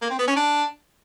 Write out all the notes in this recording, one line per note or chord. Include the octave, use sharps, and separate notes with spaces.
A#3
C4
B3
C#4
D4